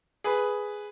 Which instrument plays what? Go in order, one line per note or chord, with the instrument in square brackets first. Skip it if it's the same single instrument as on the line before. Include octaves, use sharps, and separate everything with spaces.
[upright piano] G#4 B4 B5